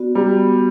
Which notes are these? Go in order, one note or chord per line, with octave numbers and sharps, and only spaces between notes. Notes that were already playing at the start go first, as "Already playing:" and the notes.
Already playing: B3 F#4 D5
G3 B3
B3